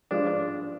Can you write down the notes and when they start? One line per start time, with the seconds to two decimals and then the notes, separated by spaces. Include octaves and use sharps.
0.11 G2 F3 G#3 D4
0.27 D4